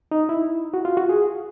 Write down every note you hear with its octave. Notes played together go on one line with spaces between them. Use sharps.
D#4
E4
F#4
F4
F#4
G#4